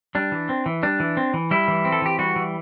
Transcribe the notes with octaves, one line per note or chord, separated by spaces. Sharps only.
G3 D4
E3
C4
E3
G3 D4
E3
C4
E3
G3 E4
E3
C4
A4
E3 G4
G3 F#4
E3